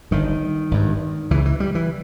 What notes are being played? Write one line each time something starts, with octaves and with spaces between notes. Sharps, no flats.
G1 G2 D#3
G#1 G2
C#2 C#3 E3
E3
G3
E3